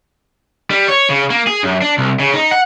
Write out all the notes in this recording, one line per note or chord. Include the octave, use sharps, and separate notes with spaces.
G3
C#5
C#3
A#3
G#4
F#2
D4
C2
C#3
D#4
F#5